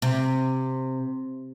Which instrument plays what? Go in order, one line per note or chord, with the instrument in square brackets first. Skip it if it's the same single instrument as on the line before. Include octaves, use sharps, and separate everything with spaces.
[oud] C3